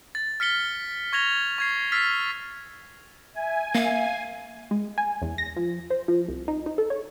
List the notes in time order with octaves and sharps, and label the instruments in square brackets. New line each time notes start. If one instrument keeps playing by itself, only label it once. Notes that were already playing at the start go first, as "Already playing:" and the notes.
[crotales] A6
F6 B6 C#7 G7
C#6 G#6 A#6 F7 G7
C#6 G#6 C7
E6 F6 A6 B6 C7
[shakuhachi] E5 [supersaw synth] G#5
[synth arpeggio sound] A#3 [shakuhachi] E5 [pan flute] F5
[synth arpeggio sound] G#3
G#5
E2
A#6
F3
C5
F3
C2
D#4
D#4
A4
C#5